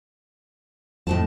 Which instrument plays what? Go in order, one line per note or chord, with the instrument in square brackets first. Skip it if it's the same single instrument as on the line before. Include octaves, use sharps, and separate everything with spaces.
[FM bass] F2 [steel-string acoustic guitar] A2 D#3 A5